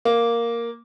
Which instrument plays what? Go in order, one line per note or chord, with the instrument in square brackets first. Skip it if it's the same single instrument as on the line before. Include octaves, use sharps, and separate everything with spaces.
[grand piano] A#3